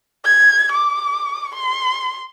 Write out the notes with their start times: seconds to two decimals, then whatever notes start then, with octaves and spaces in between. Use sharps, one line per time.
0.25 G#6
0.72 D6
1.54 C6